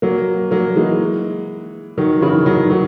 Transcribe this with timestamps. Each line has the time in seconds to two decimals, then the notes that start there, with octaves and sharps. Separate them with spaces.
0.02 F#3 A#3
0.51 F#3 A#3
0.76 E3 G#3
1.98 D#3 F#3
2.21 C#3 E3
2.46 D#3 F#3
2.70 D#3 F#3